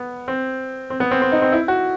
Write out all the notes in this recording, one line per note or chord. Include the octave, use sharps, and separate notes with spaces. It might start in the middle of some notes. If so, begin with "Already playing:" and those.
Already playing: B3
C4
C4
B3
C4
C4
D#4
C4
E4
F#4